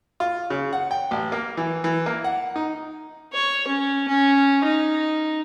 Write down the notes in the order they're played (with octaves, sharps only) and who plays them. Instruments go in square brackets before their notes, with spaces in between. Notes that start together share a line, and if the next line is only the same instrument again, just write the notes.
[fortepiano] F4
C#3
F#5
G5
A1
A#3
E3
E3
A#3
F#5
D#4
[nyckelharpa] C#5
C#4
C#4
D#4